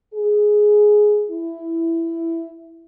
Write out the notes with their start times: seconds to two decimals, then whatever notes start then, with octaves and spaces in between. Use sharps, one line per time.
0.14 G#4
1.30 E4